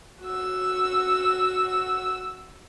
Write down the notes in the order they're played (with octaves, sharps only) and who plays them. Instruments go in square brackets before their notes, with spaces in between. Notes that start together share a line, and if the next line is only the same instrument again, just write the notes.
[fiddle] F#4 E6